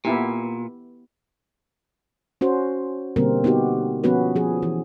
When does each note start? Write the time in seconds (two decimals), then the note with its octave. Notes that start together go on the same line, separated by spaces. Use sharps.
0.05 A#2 B3 E4 G4
2.41 C#4 F#4 C5
3.16 B2 D3 G3 A#3 C4 A#4
3.44 B3 D#4 F#4 G4
4.04 F3 B3 C#4 F#4 B4
4.36 F3 G#4
4.63 E3